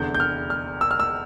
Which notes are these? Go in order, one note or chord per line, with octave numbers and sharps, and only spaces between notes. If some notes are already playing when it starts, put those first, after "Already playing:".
Already playing: F1 E2 D3 G6
G6
F6
F6
E6
F6
E6